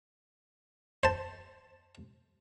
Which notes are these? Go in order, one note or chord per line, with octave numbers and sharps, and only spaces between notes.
C5 A5